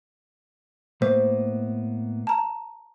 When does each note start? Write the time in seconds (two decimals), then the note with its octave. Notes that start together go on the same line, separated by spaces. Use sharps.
1.02 A2 A#3 B3 C5
2.27 A5 A#5